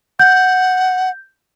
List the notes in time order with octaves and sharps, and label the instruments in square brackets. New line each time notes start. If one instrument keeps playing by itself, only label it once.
[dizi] F#5 [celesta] G6